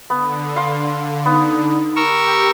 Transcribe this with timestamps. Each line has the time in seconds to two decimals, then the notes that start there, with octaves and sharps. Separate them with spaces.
0.10 D3 B3
0.56 F5 C6
1.26 B3 D#4
1.96 G4 A#4 C#6 E6